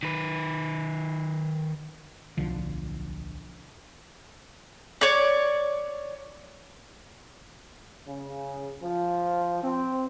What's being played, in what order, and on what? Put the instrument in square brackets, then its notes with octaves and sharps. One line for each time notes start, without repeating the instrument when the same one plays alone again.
[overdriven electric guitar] D#3 B4
[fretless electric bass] D1 B1 D3 F3
[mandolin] C#5 D5
[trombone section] C#3
F3
C4